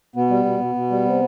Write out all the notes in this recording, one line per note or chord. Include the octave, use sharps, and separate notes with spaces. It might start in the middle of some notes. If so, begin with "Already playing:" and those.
B2 B3
G3
B2
B2
B2
G3
C3